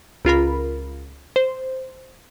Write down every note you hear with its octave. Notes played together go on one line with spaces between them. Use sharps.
C#2 F4 A#4 B5
C5